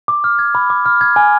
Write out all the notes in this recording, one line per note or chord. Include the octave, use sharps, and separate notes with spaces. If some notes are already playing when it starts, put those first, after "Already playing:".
D6
F6
G#6
B5
D6
F6
G#6
G#5